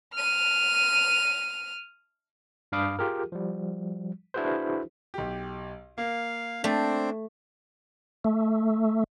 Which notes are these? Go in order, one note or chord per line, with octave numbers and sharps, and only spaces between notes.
F6 D#7
G2 D4 F5 B5 D6 D#6
F4 G4 G#4 A#4
F3 G3
D4 E4 F#4 G#4 B4 C5
B1 G4
A#3 F5
A3 C4 D4 C5
A3